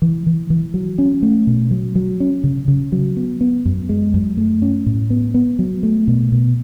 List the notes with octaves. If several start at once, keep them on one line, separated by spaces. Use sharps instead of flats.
E3
E3
E3
F#3
C#4
A3
B2
F#3
F#3
C#4
C#3
C#3
F#3
B3
B3
F#2
G#3
F#2
A3
C#4
A2
B3
B3
F#3
A3
B2
B2